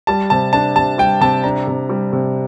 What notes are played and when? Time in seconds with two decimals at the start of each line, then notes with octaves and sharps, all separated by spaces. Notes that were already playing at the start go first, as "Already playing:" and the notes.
0.07 G3 A5
0.30 C3 A5
0.53 D4 A5
0.76 C3 A5
0.98 G3 G5
1.21 C3 A5
1.44 D4 A#5
1.67 C3
1.89 G3
2.13 C3